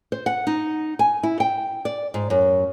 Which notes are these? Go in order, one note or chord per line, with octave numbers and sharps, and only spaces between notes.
C5
F#5
D#4
G#5
E4
G5
D5
G#2
F#2